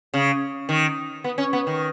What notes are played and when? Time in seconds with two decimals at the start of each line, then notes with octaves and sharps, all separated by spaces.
0.14 C#3
0.69 D#3
1.24 B3
1.38 C#4
1.53 B3
1.67 D#3